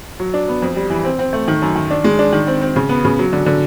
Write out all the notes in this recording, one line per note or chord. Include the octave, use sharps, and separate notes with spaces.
F#3
D4
B3
F2
G3
E3
C4
C4
A3
D#3
F#2
D#3
D4
G#3
D4
D#3
C4
C4
C#3
B3
C#3
F#3
D3
D3